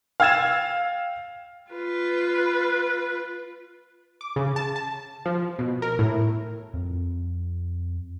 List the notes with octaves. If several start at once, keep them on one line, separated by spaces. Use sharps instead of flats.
F5 G5 E6 G#6 A6 E7
F4 B4
D6
C#3
A5
A5
F3
B2
A#4
A2
F2 B3 C4